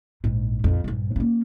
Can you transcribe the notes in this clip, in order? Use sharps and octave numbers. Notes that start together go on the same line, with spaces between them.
A#1 G#2
A#1 F2
A#1 G2
A#3 C#4